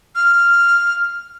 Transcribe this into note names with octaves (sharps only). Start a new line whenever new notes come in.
F6